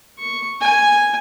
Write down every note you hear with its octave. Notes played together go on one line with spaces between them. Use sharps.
C#6
G#5